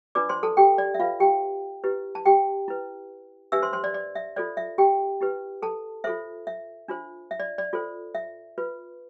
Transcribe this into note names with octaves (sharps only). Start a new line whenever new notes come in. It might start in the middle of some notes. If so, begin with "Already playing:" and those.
D4 F4 B4 D5 D6
C5 C6
A4 A5
G4 G5
D5
E5
F4 B4 F5
G4 G5
E4 G4 B4
A5
G4 G5
E4 B4
D4 G4 B4 E5 E6
C5 C6
C5 C6
D5
D5
E5
F4 A4 C5 D5
E5
G4 G5
E4 G4 B4
A4 A5
F4 A4 C5 E5
E5
D4 F4 C5
E5
D5
D5
F4 A4 C5
E5
F4 B4